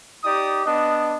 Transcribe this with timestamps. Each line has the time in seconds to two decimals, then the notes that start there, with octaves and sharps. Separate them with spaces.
0.24 D#4 G4 D5 D#6
0.65 B3 D4 D#5